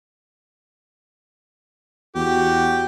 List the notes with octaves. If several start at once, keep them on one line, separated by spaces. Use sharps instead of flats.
E2 F#4 G4